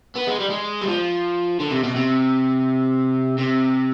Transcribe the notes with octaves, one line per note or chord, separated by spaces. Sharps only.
B3
G#3
G3
G#3
G3
F3
D3
C3
B2
C3
C3